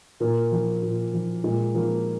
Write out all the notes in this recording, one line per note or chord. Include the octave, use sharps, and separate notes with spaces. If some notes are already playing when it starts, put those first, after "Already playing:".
A#2 A#3
F3
A#2
F3
A#2 G#3
F3 A#3